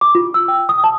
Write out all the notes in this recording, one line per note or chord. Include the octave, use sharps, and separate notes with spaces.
D6
F4
E6
G5
D#6
A5